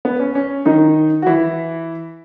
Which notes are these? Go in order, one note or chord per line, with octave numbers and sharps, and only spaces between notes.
B3
C#4
C#4
D#3 D#4
F#4
E3 E4